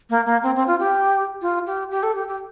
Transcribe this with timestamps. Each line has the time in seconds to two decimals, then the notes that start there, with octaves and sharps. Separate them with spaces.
0.10 A#3
0.26 A#3
0.43 C4
0.55 C4
0.67 F4
0.80 G4
1.42 F4
1.67 G4
1.91 G4
2.03 A4
2.15 G4
2.28 G4